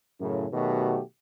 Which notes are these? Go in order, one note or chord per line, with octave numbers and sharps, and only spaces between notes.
F#2 A2 C#3
B2 D#3 F#3 A3 F#4 G4